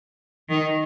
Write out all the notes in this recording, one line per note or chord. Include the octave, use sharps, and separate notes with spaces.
D#3